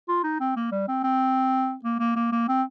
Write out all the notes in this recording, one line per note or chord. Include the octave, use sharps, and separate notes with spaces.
F4
D#4
C4
A#3
G3
C4
C4
A#3
A#3
A#3
A#3
C4